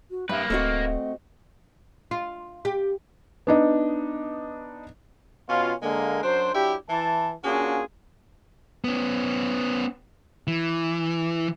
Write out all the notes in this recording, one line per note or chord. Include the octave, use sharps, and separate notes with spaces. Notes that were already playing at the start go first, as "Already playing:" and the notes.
F#4
G2 A#3 B4 E5
D1 A3 C4 F#4 D#5
F4
G4
B3 D4 D#4
B2 C#4 F4
D3 G#3 A#3
F#2 F#3 D4 C5
F#3 D4 E4 G4
E3 A5
A#3 C#4 D4 F4 F#4 G#4
B3 C#4
E3